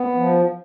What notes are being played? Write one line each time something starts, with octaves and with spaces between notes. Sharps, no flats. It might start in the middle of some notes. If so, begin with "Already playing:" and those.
Already playing: B3
F3